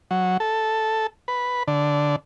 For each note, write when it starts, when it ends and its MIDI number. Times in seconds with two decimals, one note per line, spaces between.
0.11 0.37 54
0.40 1.07 69
1.28 1.63 71
1.68 2.16 50